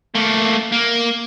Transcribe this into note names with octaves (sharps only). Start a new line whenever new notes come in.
A3 A#3
A#3